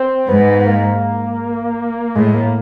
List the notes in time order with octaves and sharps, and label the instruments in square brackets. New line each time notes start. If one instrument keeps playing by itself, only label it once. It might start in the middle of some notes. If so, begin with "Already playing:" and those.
Already playing: [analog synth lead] C4
[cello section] G#2 [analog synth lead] B3
[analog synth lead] A#3
[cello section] A2 [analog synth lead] G#3
[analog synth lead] A#3